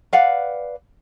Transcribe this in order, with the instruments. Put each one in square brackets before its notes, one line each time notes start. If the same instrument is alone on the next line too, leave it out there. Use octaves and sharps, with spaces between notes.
[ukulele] B4 D5 F5 F#5